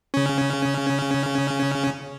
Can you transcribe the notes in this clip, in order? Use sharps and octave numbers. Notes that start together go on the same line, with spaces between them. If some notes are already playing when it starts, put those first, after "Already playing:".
C#3 C#4